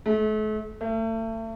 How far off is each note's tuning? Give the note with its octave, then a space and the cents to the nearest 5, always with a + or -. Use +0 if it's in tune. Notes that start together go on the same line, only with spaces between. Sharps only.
A3 -40
A3 +35